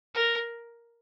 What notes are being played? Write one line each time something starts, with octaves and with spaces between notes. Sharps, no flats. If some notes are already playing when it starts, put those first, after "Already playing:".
A#4